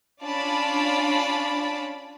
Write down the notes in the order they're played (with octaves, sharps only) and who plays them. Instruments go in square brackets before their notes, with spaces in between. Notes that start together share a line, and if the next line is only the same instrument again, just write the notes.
[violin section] C#4 D4 F4 D5 A5 B5